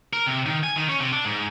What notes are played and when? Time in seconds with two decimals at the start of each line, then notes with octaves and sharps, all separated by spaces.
0.13 A#4
0.26 C3
0.46 D#3
0.64 G#5
0.76 D#3
0.89 C#4
1.00 C3
1.12 D4
1.25 G#2